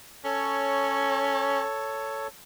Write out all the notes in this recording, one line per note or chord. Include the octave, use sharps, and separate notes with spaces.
C#4 A4 C#5